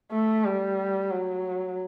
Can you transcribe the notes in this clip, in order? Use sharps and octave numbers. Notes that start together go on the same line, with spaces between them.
A3
G3
F#3